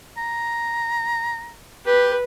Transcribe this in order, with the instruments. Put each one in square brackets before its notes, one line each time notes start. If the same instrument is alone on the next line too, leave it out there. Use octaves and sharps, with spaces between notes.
[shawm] A#5
[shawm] G4 [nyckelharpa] B4